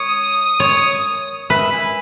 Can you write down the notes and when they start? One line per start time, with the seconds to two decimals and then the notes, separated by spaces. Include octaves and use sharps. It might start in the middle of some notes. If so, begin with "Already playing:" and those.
Already playing: C#5 D#6
0.60 C#5
1.50 B4 E5
1.72 G#5